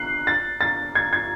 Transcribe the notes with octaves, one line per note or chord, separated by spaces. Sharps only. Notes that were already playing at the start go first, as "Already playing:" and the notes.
Already playing: F#6 C7
A6
A6
G#6
G#6